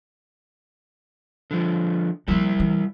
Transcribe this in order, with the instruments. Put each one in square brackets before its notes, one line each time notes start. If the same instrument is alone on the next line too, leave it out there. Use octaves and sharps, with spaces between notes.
[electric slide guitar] D3 F3
[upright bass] F3 A#3 [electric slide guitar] G3 E4
[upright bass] E3